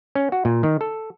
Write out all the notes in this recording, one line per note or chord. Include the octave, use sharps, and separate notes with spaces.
C#4
F#4
A#2
D#3
A4